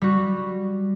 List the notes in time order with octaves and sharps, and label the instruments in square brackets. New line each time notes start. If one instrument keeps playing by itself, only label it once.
[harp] G3 F#4